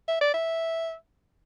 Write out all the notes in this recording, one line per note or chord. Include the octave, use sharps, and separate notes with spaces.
E5
D5
E5